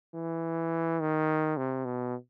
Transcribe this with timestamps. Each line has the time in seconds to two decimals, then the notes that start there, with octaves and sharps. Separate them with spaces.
0.14 E3
1.00 D#3
1.57 C3
1.85 B2